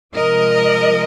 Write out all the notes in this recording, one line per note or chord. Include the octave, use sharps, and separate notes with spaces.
C3 F3 G#3 A#4 D#5